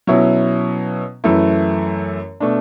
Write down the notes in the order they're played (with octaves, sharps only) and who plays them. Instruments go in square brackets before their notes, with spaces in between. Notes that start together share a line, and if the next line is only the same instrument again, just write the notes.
[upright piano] B2 F#3 C#4 E4
F#2 E3 A3 E4
B2 A3 D4